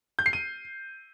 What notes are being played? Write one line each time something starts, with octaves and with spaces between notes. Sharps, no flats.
G6
C7
D#7